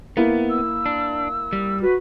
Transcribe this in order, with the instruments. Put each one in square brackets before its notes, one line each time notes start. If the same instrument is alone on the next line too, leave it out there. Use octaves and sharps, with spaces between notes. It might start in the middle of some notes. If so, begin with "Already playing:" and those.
[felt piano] A#3 E4 [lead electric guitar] B3
[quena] E6
[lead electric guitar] D4
G3
[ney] F#4 [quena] B4